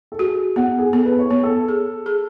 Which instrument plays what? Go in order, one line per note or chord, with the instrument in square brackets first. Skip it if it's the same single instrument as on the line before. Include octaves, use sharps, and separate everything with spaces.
[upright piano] A4
[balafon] F#4 [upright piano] G#4
[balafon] B3 [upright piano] F#5
[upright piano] G#4
[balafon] B3 [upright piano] A4
[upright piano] B4
C#5
[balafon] B3
[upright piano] A4
[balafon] G#4
G#4